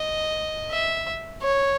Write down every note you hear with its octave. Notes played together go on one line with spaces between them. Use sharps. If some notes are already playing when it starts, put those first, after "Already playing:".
Already playing: D#5
E5
C#5